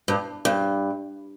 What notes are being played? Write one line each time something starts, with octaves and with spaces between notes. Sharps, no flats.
G2
G2